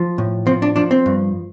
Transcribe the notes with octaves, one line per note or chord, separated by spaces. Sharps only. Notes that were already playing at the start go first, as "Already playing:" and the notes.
Already playing: F3
A2
F3 C4
D4
F3 D4
C4
G2